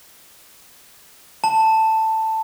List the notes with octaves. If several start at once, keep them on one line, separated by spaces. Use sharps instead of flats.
A5